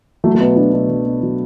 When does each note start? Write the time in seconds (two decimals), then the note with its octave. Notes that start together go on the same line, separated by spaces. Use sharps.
0.24 F#3 A3
0.35 A3
0.40 B2 B3
0.56 F#3 D4
0.73 B2 D4
0.89 F#3
1.06 B2
1.22 F#3